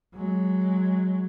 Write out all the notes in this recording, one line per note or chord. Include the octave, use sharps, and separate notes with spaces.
F#3 G#3